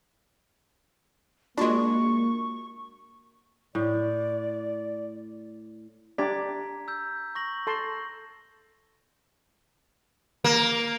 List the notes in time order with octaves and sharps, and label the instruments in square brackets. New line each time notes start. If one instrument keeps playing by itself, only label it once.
[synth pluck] G#3 D4 [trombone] A#3 [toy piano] F4 F#4 [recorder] C#6
[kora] A2 [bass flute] D5
[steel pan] D4 G4 D5 [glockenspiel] A#5 G#6 B6
[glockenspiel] E6 G6
C#6 A#6 F#7
[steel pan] A4 A5 C6
[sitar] A#3